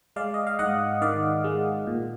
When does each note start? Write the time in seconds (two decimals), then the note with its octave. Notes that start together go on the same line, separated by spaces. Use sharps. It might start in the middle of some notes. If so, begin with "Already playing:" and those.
0.16 G#3 D5 F5
0.34 D#5
0.47 F5
0.59 G#2 D#5 F#5
1.01 D#3 D5 F5
1.44 G#3
1.87 A#2